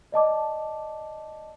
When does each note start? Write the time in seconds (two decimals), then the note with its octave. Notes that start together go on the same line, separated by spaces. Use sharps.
0.12 D5 D#5 A5 D6